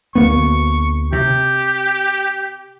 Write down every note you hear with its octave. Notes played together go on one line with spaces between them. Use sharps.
D2 A#3 B3 C#6
C3 G4